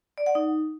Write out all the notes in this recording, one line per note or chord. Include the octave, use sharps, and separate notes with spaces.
D5
F#5
D#4